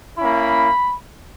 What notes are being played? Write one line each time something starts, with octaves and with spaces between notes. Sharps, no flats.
A#3 C#4 E4 B5